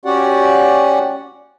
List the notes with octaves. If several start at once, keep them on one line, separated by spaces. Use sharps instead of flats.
C#4 F#4 G4 D5 F#5